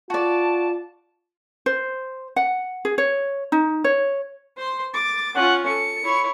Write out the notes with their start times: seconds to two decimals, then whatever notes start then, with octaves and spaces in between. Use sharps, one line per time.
0.10 F4 F#4 D5 A5
1.66 C5
2.36 F#5
2.85 G#4
2.98 C#5
3.52 D#4
3.84 C#5
4.57 C5 C6
4.94 D6 A6
5.35 C#4 F4 F#5
5.66 A4 C#7
6.03 E4 C#5